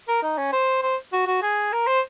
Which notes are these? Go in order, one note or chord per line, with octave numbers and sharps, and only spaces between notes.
A#4
D#4
C#4
C5
C5
F#4
F#4
G#4
A#4
C5